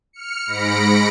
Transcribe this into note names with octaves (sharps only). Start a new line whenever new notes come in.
F6 C#7
G#2 B5 A#6 C#7 D7